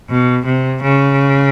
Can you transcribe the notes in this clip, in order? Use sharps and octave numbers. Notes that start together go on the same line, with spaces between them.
B2
C3
C#3